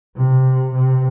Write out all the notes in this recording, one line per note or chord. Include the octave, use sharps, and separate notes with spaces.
C3
C3